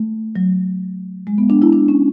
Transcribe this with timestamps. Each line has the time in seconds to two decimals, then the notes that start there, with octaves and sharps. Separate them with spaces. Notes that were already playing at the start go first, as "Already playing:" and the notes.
Already playing: A3
0.36 F#3
1.27 G#3
1.38 B3
1.50 D4
1.62 E4
1.72 D4
1.88 C#4